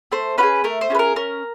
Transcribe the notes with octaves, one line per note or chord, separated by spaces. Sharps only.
A3 C5
C#4 F4 B4
G#4
A3 A#4
C5
C#4 F4 G#4 B4
A#4
C#4 A#4